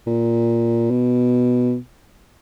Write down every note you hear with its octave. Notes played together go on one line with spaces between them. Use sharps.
A#2
B2